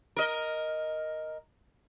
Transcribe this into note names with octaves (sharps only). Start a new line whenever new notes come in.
A#4 D#5